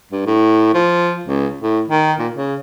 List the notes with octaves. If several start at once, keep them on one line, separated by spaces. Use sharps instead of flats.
G2
A2
F3
C#2
A2
D#3
A#2
C#3